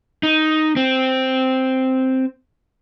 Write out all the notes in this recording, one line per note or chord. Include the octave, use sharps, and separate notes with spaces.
D#4
C4